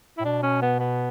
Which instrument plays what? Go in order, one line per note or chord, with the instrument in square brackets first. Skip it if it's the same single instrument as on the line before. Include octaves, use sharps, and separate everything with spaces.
[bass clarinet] A2 [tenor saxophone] E4
[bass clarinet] B2 [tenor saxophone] D4
[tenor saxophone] C#4
B3
B3